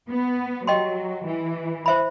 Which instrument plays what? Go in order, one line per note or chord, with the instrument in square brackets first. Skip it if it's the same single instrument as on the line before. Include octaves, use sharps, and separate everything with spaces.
[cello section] B3
[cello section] F#3 [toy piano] G4 D#5 G5 C6
[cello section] E3
[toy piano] C5 E5 B5